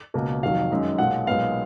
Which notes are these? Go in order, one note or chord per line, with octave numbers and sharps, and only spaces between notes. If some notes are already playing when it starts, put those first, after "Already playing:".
C#2 B2 A#3
F1 F2 D#3 F#3 F5
F#2 D#3 G#3
B1 A#2 G#3 F#5
B1 A#2 G#3 B3 F5